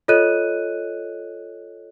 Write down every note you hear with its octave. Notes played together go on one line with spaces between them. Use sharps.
F4 A4 C#5 D#5 F#6 D#7